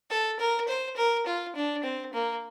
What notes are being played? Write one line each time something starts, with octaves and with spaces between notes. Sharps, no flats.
A4
A#4
C5
A#4
F4
D4
C4
A#3